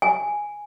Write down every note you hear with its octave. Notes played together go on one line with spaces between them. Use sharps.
G#5